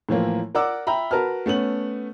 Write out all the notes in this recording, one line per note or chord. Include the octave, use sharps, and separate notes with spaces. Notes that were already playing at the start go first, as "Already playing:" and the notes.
A2 E3 F3 A#3
A#4 D5 F#5 D6 E6
E5 G5 A#5 B5
F#4 A#4 B4 A5 F6
A3 B3 C#4 F#7